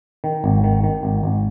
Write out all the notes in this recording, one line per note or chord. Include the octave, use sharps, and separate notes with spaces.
D#3
G#1
D#3
D#3
G#1
G#1